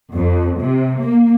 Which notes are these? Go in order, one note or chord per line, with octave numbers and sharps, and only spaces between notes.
F2
C3
A#3